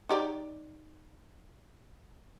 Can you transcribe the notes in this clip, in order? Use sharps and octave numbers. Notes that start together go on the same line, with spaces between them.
D#4 G4 D5